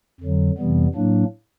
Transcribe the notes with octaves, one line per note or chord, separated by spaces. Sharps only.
F2 D3 F#3
F2 C3 E3 G3 B3
A2 F#3 A#3 D4